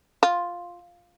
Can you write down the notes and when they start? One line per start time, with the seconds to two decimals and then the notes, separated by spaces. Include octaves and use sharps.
0.23 F4